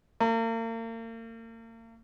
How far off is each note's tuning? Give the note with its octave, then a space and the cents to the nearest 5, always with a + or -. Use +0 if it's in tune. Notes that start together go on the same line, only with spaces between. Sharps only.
A#3 -40